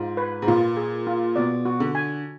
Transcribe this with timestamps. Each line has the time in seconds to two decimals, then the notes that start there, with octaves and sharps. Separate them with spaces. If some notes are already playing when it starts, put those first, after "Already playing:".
Already playing: G#2 F4
0.17 B4
0.42 G#2
0.47 A#2 F4
0.77 G#4
1.07 F4
1.36 B2 D5
1.65 F#4
1.80 D3
1.95 G#5